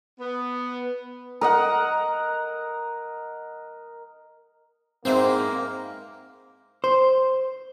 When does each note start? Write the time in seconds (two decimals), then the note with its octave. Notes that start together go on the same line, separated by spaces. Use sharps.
0.19 B3
1.41 A#4 D#5 F#5
5.05 G#2 A#3 C4 E4 B4 C5
6.84 C5